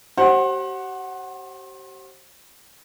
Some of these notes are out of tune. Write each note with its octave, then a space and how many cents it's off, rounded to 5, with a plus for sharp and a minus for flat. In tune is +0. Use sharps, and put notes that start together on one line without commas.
G4 -40 C5 +35 F#5 +0